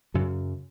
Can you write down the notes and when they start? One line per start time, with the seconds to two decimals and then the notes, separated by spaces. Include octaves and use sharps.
0.14 F#2 C#3 F#3